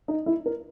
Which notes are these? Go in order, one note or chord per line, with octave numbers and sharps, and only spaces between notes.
D#4
E4
A#4